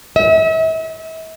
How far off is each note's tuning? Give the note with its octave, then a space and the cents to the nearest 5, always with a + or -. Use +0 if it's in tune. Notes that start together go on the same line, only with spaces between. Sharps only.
E5 -40